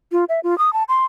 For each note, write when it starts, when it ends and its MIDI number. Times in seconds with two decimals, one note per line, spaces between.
0.12 0.25 65
0.29 0.40 76
0.44 0.57 65
0.58 0.73 87
0.73 0.83 81
0.89 1.05 84